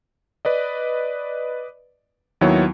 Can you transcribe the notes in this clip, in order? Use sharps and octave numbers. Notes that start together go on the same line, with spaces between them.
B4 D5 D#5
D#2 D#3 F#3 B3 E4 C#5